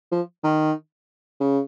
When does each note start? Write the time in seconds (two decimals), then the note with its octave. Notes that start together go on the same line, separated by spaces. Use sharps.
0.12 F3
0.44 D#3
1.40 C#3